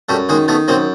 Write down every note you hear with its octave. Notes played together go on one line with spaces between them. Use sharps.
F#2 G3 A3
D#3 G#3 A#3
D#3 A3 B3
F#2 A#3 C4